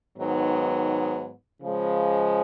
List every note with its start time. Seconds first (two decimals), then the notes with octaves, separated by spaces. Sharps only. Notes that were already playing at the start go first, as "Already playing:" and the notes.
0.17 G#2 D#3 F#3 B3
1.61 C#3 F3 G#3